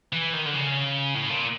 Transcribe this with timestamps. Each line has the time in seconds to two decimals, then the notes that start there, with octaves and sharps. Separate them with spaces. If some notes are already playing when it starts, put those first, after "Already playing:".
0.13 E3
0.33 D#3
0.45 D3
0.54 C#3
1.14 A2
1.30 A#2